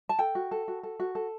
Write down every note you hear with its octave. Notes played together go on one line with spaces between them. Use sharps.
A5
A4 G5
F#4
A4
F#4
A4
F#4
A4